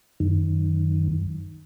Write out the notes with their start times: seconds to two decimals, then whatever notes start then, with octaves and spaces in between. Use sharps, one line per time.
0.20 F#2 D#3